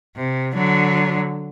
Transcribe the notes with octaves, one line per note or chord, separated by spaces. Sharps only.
C3
D3 F#3